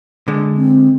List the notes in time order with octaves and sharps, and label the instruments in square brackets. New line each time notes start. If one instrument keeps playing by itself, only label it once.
[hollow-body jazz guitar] D3 G#3
[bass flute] C4